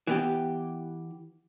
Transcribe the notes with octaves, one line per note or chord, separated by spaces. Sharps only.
E3 B3 G4